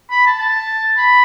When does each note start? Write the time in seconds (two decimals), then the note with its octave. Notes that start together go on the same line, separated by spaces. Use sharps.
0.11 B5
0.26 A5
0.40 A5
0.98 B5